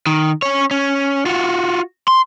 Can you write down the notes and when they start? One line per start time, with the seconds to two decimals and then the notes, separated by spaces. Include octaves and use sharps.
0.07 D#3
0.42 C#4 C#5
0.71 C#4
1.26 F4 F#4
2.08 C6